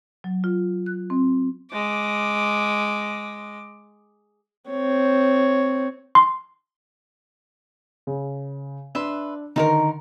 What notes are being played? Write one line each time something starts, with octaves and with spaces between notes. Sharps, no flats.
F#3
F4
F#6
C4
G#3 D6
C4 C#5
C6
C#3
D4 B4 E5 C6
D3 D#3 D#4 A4 A#4